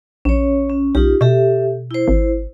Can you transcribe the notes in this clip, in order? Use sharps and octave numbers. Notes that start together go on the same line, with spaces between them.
A#1 C#4 C#5
C#4
B1 D#4 F4 G4
B2 G4 A4 E5
E4 C5
G#1